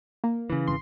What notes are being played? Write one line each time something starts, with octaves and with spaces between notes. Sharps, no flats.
A#3
C#3 E3
G#1 C6